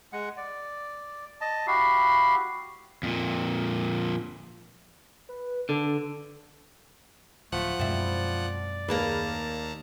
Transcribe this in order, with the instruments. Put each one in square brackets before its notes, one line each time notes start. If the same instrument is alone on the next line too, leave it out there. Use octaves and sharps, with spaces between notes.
[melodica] G#3 F#5
D5
D#5 A5
E4 F#4 G4 F5
[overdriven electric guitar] F2 A#2
[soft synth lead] B4
[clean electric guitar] D3 [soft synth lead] A4
[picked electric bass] D1 [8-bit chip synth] F3 F#5 F#6 [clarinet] A3
[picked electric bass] F#2 B2 G#3 [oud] C4 E4 [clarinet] D5
[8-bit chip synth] D#2 A5 A#5 [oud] A#3 G#4 B4